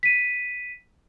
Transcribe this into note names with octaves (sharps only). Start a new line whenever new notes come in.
B6 D#7